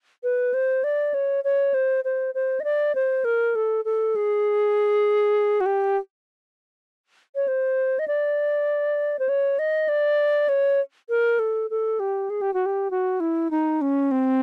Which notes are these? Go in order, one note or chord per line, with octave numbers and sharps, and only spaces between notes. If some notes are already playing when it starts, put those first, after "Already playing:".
B4
C5
D5
C#5
C#5
C5
C5
C5
D#5
D5
C5
A#4
A4
A4
G#4
F#4
G4
C#5
C5
D#5
D5
C5
C#5
D#5
D5
C#5
A#4
A4
A4
G4
G#4
G4
F#4
G4
F#4
E4
D#4
C#4
C4